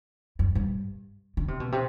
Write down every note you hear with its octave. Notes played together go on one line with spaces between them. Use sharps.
F#2
G2
D3
C3
B2
C3